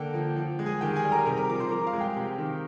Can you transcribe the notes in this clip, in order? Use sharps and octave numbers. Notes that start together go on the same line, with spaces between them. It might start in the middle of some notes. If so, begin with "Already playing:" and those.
Already playing: D3 A#3 G5
F3
F3
G#3
G#4 G#5
D#3 G4 G5
G#4 G#5
G3
A#4 A#5
C3 A#4 A#5
A#4 A#5
F3 D6
C5 C6
F3 A#4 A#5
F5
G#3
G4 G5
C3
D#3